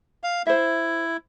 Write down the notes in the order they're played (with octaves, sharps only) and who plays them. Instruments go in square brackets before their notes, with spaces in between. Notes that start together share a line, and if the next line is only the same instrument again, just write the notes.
[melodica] F5
[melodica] E4 [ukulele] C5 E5